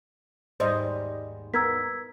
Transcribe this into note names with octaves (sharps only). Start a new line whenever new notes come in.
D#2 G#2 G3 C5 D#5
B3 A#4 E6 G#6 B6